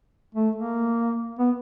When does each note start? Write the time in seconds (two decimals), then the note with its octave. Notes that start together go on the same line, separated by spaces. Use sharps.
0.35 A3
0.56 A#3
1.39 B3